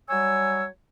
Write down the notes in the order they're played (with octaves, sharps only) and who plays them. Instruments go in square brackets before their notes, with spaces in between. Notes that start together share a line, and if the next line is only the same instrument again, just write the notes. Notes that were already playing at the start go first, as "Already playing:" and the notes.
[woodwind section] F#3 G3 C#5 G#5 E6